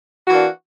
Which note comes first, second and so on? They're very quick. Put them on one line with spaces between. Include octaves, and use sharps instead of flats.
F#4 E3 A#3 D4